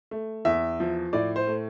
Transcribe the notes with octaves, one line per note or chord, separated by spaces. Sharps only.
A3
E2 E5
F3
A2 D5
C5
A3